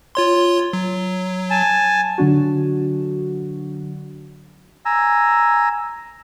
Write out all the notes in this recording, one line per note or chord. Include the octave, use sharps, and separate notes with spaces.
F4 C#5 C6
F#3
G#5 A5
D3 F#3 D4 F#4
G#5 A#5 E6